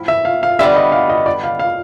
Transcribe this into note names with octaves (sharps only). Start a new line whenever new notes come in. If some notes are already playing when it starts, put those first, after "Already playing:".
Already playing: A2 F3 E4
E5
F5
F5
D3 G3 B3 E5
D#5
F5
D#5
D5
F5
F5